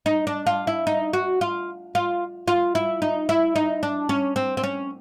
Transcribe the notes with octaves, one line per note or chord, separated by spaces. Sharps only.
D#4
D4
F4
E4
D#4
F#4
F4
F4
F4
E4
D#4
E4
D#4
D4
C#4
C4
C4
C#4